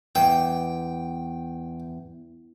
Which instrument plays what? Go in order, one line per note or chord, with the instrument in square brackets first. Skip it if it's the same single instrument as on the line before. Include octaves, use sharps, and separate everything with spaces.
[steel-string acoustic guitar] E2 [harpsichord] G5